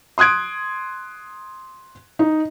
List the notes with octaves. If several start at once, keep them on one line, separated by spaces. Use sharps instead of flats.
C6 D#6 F#6 G#6 D7
D#4